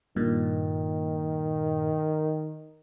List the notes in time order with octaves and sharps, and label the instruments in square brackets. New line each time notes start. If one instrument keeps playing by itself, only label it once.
[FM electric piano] G2 A#2 [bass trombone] D#3